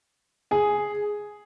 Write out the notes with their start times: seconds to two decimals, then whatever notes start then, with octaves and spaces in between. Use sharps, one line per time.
0.51 G#4 G#5